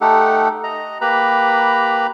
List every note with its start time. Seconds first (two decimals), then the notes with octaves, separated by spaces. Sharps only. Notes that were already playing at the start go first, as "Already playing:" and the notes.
0.01 A3 D#4 G4 A4 F#5
0.64 D#5 A#5
1.01 A#3 G4 B4 A#5 B5